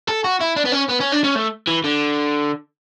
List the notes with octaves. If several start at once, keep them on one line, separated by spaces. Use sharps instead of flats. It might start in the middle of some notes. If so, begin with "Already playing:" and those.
A4
F#4
E4
D4
B3
C#4
B3
C#4
D4
C#4
A3
E3
D3